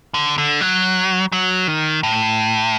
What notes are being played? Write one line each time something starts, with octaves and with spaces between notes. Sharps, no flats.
D3
D3
F#3
F#3
D#3
A2